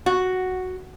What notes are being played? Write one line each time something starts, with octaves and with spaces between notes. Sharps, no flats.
F#4